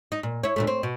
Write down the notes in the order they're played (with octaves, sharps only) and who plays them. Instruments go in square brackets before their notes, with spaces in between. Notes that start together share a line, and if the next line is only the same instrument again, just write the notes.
[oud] D#4
A#2
E4 C#5
D2 A#2 A3
C4
B2